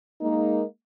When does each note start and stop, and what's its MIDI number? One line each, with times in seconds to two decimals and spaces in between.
0.21 0.63 56
0.21 0.63 58
0.21 0.63 63